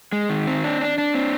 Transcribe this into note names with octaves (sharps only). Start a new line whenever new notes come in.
G#3
D#3
C4
D4
D4
D4
C4